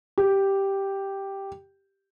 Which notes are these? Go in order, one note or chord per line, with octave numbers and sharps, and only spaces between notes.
G4